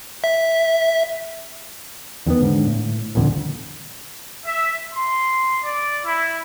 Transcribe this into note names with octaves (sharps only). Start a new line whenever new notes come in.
E5
E2 D#3 B3
G#2 D3
A2
D#1 A#1 F2 D3
E5
C6
D5
E4